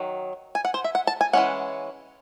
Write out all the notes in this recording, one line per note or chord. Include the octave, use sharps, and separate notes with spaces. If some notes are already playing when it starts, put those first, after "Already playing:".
Already playing: D#3 F#3
G#5
F#5
C5
E5
F#5
A5
G#5
E3 G#3 C#4 F#5